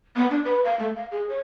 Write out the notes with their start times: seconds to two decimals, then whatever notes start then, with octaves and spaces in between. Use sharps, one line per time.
0.16 B3
0.31 D4
0.45 B4
0.65 F5
0.80 A3
0.96 F5
1.11 G#4
1.29 C#5